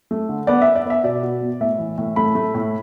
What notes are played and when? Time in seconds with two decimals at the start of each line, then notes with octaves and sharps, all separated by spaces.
0.11 A3
0.29 D3
0.47 B3 D5
0.62 B3 E5
0.76 D5
0.86 B3 E5
1.03 B2 D5
1.23 B2
1.41 B3
1.60 A2 E5
1.79 E3
1.98 A2
2.16 A3 B5
2.35 A3
2.54 A2